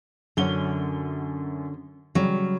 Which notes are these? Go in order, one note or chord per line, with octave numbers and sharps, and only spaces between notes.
F#2 D3 F#3 C#4 G7
C#3 F#3 G3